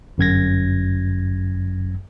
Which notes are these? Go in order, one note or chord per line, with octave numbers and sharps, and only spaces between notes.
G1 F#2 G#6 A#6